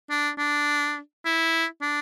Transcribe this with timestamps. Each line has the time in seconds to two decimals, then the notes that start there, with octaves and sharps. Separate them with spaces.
0.10 D4
0.38 D4
1.25 E4
1.82 D4